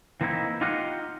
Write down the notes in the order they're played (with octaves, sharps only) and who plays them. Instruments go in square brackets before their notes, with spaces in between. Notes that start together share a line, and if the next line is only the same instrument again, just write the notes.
[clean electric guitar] E3 A#3 C4 D#4 E4
D#4 F4 G4 D#5 F5 F#5